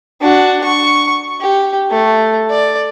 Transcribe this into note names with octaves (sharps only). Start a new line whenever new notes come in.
D4 F#4
C#6
G4
A3
D5